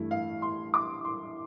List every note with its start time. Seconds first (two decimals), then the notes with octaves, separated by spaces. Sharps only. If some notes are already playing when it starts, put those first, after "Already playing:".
Already playing: G2 E3 A3 E4
0.11 F5
0.42 C6
0.74 D6
1.05 C6